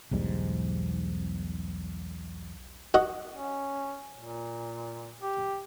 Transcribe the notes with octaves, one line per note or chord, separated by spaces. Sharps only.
B1 E2 G#2 G3
F#4 D#5
C#4
A#2
G4